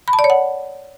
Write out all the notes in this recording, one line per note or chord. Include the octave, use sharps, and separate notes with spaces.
B5
A5
D5
C#5
F#5